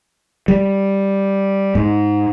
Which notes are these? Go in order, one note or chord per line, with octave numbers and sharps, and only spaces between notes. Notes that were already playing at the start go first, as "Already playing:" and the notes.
G3
G#2